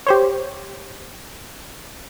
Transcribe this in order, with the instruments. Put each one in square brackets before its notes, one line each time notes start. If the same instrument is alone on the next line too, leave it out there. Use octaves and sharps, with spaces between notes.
[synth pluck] G4 C5 C#5